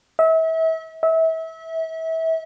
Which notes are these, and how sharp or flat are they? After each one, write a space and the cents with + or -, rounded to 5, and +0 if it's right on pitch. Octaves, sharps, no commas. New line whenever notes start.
E5 -35
E5 -30